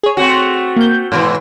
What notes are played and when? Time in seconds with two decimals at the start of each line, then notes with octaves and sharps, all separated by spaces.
0.03 G#4 C#5
0.17 A3 C4 F#4
0.76 A#3 G6
1.12 G#2 B2 E3